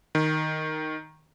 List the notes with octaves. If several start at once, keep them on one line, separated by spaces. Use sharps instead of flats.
D#3